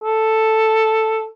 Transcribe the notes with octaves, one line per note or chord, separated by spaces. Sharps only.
A4